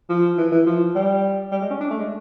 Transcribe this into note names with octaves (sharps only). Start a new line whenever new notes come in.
F3
E3
E3
F3
G3
G3
G#3
C#4
D4
A3
G#3